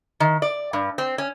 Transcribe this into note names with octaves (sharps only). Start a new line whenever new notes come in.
D#3
D5
G2
C4
C#4